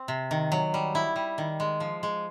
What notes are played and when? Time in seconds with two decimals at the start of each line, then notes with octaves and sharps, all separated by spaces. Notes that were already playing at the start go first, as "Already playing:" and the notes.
Already playing: C4
0.08 C3
0.31 D#3
0.52 F#3
0.74 G3
0.95 E4
1.16 G3
1.38 D#3
1.60 G#3
1.80 F3
2.03 G#3